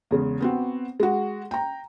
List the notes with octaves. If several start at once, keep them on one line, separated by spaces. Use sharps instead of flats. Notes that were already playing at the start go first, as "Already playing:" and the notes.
E2 C#3 G#3
B3 C4 F#4
G#3 F#4
G5 A#5